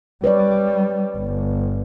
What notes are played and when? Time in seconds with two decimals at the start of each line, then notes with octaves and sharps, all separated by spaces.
0.24 G3 B4 C#5 D5
1.17 G1